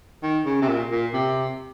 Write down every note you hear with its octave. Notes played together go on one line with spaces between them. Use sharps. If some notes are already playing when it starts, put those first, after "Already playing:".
D#3
C#3
C3
A#2
A#2
C3